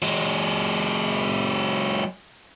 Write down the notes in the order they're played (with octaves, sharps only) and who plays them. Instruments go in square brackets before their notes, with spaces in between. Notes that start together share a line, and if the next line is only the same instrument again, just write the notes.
[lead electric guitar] F#3 G#3